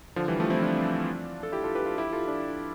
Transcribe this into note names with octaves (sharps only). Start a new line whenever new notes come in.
D3 F3
E3 G3
F3 A3
C4 E4
D4 F4
A4
E4 G4
F4 A4
G4 B4
F4 A4
E4 G4
F4 A4
D4 F4